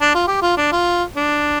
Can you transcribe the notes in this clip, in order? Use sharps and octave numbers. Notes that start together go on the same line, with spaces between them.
D4
F4
G4
F4
D4
F4
D4